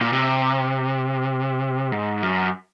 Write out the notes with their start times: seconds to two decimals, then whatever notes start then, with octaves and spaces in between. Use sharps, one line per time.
0.01 A#2
0.13 C3
1.92 G#2
2.23 F#2